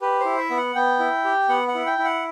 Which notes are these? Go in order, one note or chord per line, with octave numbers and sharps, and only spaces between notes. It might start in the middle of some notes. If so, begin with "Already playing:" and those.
G4 B4
C5
E4
E5
B3
F#5
B3 G5
E4
G4
B3 F#5
F#5
E4
G5
E4
F#5